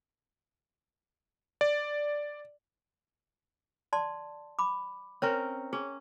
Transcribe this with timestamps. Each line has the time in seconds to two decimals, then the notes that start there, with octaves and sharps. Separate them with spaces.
1.61 D5
3.93 D5 A5 C6
4.59 B5 D6
5.22 C4 C#4 A#4 C#5
5.73 C#4 G#4